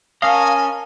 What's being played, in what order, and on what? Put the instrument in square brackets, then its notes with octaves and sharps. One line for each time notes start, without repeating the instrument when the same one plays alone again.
[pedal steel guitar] C#4 D#5 [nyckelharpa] A#4 A5 [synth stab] F5 [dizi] G#5